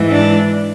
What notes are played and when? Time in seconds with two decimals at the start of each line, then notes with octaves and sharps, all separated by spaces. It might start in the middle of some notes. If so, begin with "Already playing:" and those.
Already playing: G#2 E3
0.10 D4